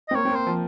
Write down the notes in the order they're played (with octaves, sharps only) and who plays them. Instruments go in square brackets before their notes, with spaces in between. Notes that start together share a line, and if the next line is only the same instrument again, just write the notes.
[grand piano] C4 [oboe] D#5
[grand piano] A#3 [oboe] C#5
[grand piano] C4
A#3
[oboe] C5
[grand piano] F3